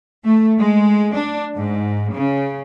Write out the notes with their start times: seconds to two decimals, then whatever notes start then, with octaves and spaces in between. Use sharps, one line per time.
0.24 A3
0.58 G#3
1.15 D4
1.55 G#2
2.11 C#3